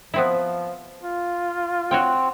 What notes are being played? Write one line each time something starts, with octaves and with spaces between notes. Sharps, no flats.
F3 B3 C4 E4
F4
C4 F#4 C#5 G5